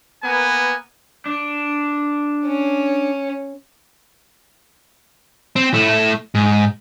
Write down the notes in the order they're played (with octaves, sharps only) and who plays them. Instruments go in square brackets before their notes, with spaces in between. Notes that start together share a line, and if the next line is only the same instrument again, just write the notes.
[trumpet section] A#3 B3 A#4 B4 G#5
[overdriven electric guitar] D4
[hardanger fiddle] C#4
[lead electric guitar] C4
A3 E4
G#2